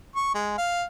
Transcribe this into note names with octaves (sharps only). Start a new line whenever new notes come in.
C#6
G#3
F5